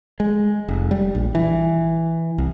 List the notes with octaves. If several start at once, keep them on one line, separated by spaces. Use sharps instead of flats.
G#3
F1
G3
A#1
E3
C2